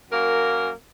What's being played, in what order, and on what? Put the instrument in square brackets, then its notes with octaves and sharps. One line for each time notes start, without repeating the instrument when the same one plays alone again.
[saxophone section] F#2 A#3 A#4